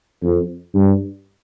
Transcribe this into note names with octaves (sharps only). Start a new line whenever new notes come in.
F2
G2